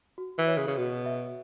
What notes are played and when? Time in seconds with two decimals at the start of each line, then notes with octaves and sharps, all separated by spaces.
0.18 F#4
0.38 E3
0.48 C#5
0.57 C#3
0.67 C#3
0.77 B2 F#4
1.06 E5